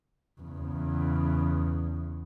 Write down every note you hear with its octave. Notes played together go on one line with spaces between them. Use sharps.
E2 C#3